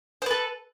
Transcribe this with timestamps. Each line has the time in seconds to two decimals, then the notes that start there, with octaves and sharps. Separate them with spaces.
0.22 C5
0.26 B4
0.31 A4